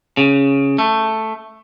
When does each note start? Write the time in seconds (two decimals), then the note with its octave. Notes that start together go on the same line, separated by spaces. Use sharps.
0.17 C#3
0.78 A3